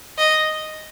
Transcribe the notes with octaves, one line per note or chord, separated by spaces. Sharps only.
D#5